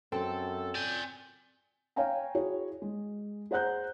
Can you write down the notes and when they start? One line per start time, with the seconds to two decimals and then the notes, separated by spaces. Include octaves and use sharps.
0.12 F#2 C4 A4
0.75 D5 G#5 G6
1.96 C#5 F5 G5 G#5 A#5
2.35 E4 F#4 G#4 C#5
2.82 G#3
3.51 G#4 C5 F#5 A#5 F#6 G6